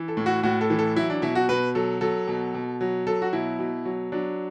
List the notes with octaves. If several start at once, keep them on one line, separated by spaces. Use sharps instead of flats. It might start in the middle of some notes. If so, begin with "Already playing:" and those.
Already playing: E3
A4
A2
F#4
A2 F#4
A4
E3
A4
F#3 E4
D4
B2 E4
F#4
B2 B4
F#3 A4
F#3 A4
B2
B2
F#3
F#3 A4
F#4
B2 E4
B2
F#3
F#3 D4